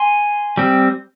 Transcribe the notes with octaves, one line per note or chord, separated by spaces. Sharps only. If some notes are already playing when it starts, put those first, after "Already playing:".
Already playing: G#5 C6
G3 C4